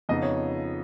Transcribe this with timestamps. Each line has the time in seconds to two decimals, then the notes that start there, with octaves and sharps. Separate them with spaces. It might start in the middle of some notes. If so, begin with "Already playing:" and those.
0.09 F2 C#3 F3 B3 D#4 D#5
0.22 C#5